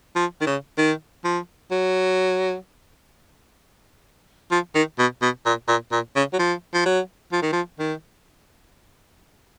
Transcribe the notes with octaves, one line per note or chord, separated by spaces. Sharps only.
F3
D#3
C#3
D#3
F3
F#3
F3
D#3
B2
B2
A#2
A#2
A#2
C#3
F#3
F3
F3
F#3
F3
D#3
F3
D#3